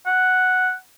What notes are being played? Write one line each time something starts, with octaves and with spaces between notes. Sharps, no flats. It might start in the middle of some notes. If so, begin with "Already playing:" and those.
F#5